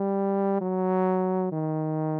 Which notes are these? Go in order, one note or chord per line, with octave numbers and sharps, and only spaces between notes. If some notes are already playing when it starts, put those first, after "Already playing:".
Already playing: G3
F#3
D#3